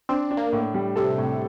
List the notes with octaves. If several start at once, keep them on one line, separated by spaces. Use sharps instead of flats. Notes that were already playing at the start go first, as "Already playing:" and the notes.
C4 D4
D4
A#3
A2
G3
C3 A4
A2